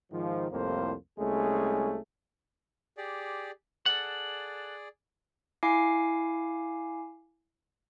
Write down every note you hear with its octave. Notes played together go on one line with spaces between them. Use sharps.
G#2 D#3 F3
C2 F2 A2 A#3 C5
C2 G#3 A3 C#4 G#4
G4 G#4 D5
G#4 A4 D5 F#5
E4 F5 G#5 D6 C7